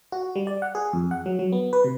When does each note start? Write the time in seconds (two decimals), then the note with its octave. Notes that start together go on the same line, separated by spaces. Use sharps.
0.12 F#4
0.36 G3
0.47 D5
0.62 F#5
0.75 G#4
0.93 F2
1.11 F#5
1.26 F#3
1.39 F#3
1.52 B3
1.73 B4
1.84 C3